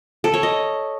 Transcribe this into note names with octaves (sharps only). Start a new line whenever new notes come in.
A4
C#5
D#5